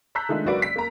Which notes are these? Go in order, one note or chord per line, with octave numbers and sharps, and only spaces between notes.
A5 A#5 E6 F#6 G6 B6
D#3 G#3 A3 D4 D#4 F4
F#1 A#3 F#4 B4 D5 D7
B6
A#3 A#5